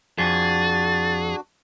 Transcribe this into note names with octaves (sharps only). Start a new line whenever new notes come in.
F2 D4 F#4 G#4 A6